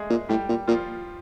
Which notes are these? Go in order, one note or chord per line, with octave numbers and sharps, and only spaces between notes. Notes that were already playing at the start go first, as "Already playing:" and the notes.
Already playing: G#3 A3 G#4
A#2
A2 G3 G4
A#2
A#2 F3 F4